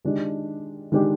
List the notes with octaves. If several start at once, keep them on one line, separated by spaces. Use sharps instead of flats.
D#3 G#3 D4 G4
D#3 G#3 D4 G4